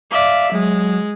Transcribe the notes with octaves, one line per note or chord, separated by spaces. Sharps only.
D5 E5 F5
F#3 G#3